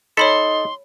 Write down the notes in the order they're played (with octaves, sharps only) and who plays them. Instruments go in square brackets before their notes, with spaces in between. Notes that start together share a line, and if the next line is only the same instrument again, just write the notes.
[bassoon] D#4 [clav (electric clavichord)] A4 [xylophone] C#5 B5 B6 [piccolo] C6